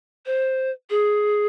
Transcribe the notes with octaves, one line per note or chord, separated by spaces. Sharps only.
C5
G#4